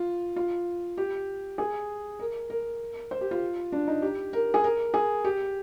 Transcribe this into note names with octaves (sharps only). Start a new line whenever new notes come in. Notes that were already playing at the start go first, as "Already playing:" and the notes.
Already playing: F4
F4
G4
G#4
A#4
A#4
C5
G4
F4
D4
D#4
G4
A#4
G#4
A#4
G#4
G4